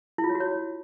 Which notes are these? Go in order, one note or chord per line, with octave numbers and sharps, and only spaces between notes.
E4
F4
C#5
F#4
C#5